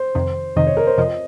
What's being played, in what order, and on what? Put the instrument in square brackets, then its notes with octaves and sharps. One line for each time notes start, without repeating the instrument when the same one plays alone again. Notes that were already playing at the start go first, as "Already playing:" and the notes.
Already playing: [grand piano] C5
[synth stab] F2 C3 D#3
[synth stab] F2 C3 D#3 [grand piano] D#5
[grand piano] C#5
A#4
C5
[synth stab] F2 C3 F3 [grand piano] D#5